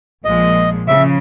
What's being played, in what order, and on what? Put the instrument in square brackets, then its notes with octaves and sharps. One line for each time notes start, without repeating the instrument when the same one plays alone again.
[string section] A#1 A#2 F3 G#3 [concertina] D#5
[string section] C#3 F3 [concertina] E5